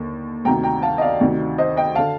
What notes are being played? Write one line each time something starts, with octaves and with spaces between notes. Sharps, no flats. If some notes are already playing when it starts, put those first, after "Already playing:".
Already playing: D#2 D3
D2 C3 D#3 G5 A#5
G5 A#5
F5 A5
D#5
D5 F5
D2 C3 D#3
C5 D#5
D#5 G5
D3 F5 A5